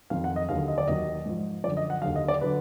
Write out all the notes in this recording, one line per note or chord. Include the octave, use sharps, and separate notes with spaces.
F2 D#3 F#3 F5
F#5
D#5
D#2 D3 F#3 F5
D#5
D5
D#2 D#3 F#3 D#5
G#2 F3
F#2 D3 F3 D5
D#5
F#5
D#2 D3 F#3 F5
D#5
D5
D3 F#3 B4